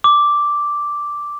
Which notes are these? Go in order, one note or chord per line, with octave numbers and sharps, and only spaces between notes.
D6